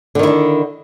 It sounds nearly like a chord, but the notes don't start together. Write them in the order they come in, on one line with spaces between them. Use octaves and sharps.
D3 D#3 E4 D4